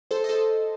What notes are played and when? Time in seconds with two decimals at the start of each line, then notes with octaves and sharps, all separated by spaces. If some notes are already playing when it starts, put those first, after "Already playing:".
0.11 A4 C5
0.24 D#5
0.29 A4 C5